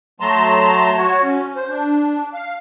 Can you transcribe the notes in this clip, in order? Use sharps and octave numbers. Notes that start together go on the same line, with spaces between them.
F#3 A3 A5 A#5 C6
F#4 C#5
C#4
C5
D4
F5